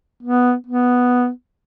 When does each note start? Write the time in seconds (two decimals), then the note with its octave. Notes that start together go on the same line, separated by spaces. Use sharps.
0.23 B3
0.67 B3